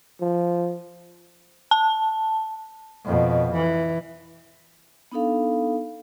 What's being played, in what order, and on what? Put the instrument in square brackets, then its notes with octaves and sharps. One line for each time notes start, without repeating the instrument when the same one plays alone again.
[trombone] F3
[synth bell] A5
[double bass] F2 B2
E3
[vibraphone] B3 D4 D#4 A4 F5